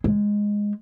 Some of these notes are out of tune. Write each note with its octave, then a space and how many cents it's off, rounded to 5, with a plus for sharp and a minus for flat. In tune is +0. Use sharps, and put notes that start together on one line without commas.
G#3 -10